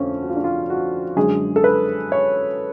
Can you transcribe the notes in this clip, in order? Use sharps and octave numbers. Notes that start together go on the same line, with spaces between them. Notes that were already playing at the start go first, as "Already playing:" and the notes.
Already playing: F2 D3 A3 C#4
F#4
F4
D4
F4
F#4
F#2 D3 G#3 G#4
A4
B4
C#5